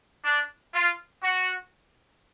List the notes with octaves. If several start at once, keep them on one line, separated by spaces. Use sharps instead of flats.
D4
F4
F#4